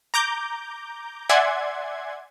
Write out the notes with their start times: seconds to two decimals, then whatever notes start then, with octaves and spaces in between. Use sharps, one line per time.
0.14 A#5 D6 G6
1.29 D5 E5 F#5 G#5 C6 G#6